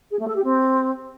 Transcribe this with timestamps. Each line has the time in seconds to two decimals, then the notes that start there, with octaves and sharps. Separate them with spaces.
0.11 G#4
0.19 A3
0.27 A4
0.35 G4
0.44 C4